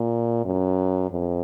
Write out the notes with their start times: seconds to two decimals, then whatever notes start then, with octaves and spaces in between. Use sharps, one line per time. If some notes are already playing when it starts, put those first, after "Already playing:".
Already playing: A#2
0.45 F#2
1.11 F2